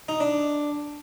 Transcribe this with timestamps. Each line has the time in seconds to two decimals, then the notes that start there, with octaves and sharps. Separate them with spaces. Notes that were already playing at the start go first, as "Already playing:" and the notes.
0.09 D#4
0.20 D4